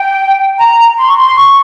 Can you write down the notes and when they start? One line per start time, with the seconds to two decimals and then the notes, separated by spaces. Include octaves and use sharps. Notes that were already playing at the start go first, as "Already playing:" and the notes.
Already playing: G5
0.59 A#5
0.97 C6
1.07 C#6
1.16 C6
1.36 C#6